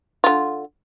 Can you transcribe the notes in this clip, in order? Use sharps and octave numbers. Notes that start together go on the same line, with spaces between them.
D3 F4